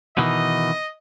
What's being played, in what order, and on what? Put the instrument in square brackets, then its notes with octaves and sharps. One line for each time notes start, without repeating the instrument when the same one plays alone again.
[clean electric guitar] B2 D#3 E3 [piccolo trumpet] D#5